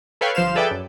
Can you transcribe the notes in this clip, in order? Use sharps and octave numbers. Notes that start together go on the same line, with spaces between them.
A4 B4 C#5 F5 G5
G1 F3 C5 F5 E7
G#4 A4 B4 D5 E5 G5
F#2